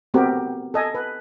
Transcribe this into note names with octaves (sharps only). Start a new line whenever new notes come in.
A3 B3 C4 F#4 G4 A#4
A4 D#5 G#5
B4